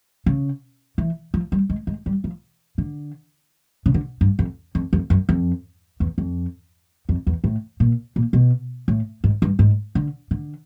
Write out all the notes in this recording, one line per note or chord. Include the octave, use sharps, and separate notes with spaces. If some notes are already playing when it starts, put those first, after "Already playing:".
C#3
E3
F3
G3
G#3
G#3
G3
F3
D3
C#3
D3
G2
F2
F2
F2
F#2
F2
E2
F2
F2
E2
A2
A#2
A#2
B2
A2
G#2
G2
G#2
D3
D3